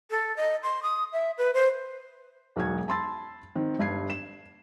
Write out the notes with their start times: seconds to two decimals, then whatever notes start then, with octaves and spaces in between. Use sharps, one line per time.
0.11 A4
0.37 D#5
0.63 C6
0.83 D#6
1.13 E5
1.38 B4
1.54 C5
2.56 E1 B1 F#4 F#5 G#6
2.88 A5 B5 C6 E6 A6
3.56 D#3 C4
3.79 G1 G2 G#6 C7
4.10 E7